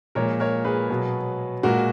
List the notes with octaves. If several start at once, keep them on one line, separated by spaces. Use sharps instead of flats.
A#2 F3 G#3 A#4 C#5
A#4 C#5
G#4 B4
B2 F#3
A#2 G#3 F#4 A#4